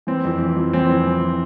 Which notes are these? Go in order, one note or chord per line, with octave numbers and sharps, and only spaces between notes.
E3 C4
F2
E3
F2
E3 C4
F2
E3